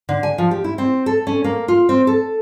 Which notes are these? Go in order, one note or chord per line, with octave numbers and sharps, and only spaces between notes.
D3
G#5
F3
G4
E4
C4
A4
C#4
A#3
F4
C4
A4